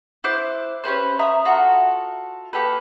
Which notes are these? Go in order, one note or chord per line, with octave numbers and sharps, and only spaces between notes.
E4 C5 D6 F#6
C#4 G4 B4 C5
E5 A#5 D#6
F4 F#4 A4
A#3 G4 A4 B4